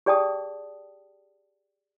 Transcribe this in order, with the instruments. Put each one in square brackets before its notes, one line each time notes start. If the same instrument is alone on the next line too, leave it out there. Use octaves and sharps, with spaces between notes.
[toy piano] G4 G#4 D5 G5 A5 D#6